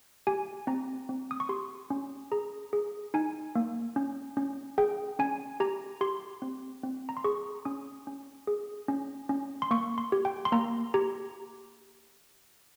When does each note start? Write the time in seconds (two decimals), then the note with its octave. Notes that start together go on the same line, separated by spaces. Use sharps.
0.27 G4 G#5
0.67 C4 A#5
1.09 C4
1.31 D#6
1.40 C#6
1.49 G4 C6
1.90 C#4
2.32 G#4 A#5
2.73 G#4
3.14 D#4 G#5
3.55 A#3
3.96 C#4
4.37 C#4
4.78 G#4 G5
5.19 C#4 G#5
5.60 G4 A#5
6.01 G4 C6
6.42 C4
6.83 C4
7.09 A#5
7.17 C6
7.24 G#4 C#6
7.65 C#4 D#6
8.07 C#4
8.47 G#4
8.88 C#4
9.29 C#4
9.62 C6
9.71 A#3 C#6
9.98 C6
10.12 G4
10.25 G5
10.45 C6
10.52 A#3 A#5
10.94 G4 A#5